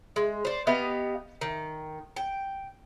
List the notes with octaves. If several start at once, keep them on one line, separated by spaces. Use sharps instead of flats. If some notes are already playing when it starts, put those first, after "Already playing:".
G#3
C5 D5
B3 G4 D#5 F5
D#3
G5